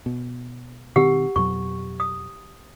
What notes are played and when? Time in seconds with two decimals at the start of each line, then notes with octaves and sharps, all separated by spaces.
0.06 B2
0.96 B2 D#3 C4 G4 F#5 E6
1.36 F2 B2 F#3 C#6
2.00 D#6